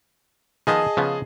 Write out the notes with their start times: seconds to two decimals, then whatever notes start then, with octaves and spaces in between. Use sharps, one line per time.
0.67 D#3 F3 B3 G#4 D#5 A5
0.97 C#3 F3 B3